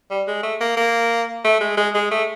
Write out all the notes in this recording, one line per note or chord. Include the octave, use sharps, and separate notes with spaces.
G3
G#3
A3
A#3
A#3
A3
G#3
G#3
G#3
A3